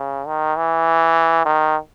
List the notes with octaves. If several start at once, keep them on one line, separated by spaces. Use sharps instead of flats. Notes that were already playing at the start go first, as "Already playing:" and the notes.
Already playing: C#3
D#3
E3
D#3